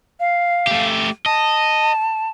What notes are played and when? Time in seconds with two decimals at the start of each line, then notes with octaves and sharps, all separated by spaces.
0.20 F5
0.67 A3 G4
1.26 D#5 A5